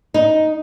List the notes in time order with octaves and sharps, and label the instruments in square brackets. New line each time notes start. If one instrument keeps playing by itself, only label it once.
[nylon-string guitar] D#4